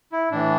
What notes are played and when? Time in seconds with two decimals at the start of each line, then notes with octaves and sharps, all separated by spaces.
0.12 E4
0.32 A2 E3 D4